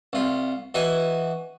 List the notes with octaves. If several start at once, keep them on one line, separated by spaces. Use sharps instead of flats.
C2 F4
E3 F#4 D#5 G5 G#5